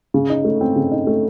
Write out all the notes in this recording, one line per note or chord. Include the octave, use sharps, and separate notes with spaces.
C#3
D#4
A3
C4
C#3
D#4
A3